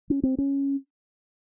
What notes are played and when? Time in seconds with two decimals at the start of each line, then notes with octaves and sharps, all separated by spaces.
0.10 C#4
0.23 C4
0.38 C#4